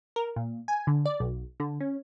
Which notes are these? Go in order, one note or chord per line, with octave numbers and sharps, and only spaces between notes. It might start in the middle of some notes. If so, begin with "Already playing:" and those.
A#4
A#2
G#5
D3
D5
B1
D3
C#4